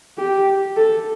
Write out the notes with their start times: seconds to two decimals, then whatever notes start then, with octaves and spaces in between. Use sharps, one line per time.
0.18 G4
0.76 A4